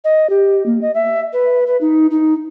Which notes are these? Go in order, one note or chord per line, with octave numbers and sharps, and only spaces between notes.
D#5
G4
A#3
D#5
E5
B4
B4
D#4
D#4